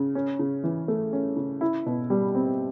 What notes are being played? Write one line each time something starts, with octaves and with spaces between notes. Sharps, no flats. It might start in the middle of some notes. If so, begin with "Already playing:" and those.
Already playing: C#3
C#4
C#3
E3
A3
C#4
C#3
E4
B2
G3
C4